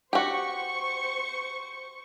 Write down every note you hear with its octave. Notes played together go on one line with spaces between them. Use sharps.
F#4 G4 C5 C#6